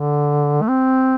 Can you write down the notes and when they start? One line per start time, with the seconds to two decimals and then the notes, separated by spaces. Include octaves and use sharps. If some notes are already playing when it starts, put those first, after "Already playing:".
Already playing: D3
0.62 A3
0.68 C4